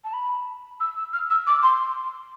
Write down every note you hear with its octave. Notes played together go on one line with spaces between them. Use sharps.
A5
B5
E6
E6
F6
E6
D6
C6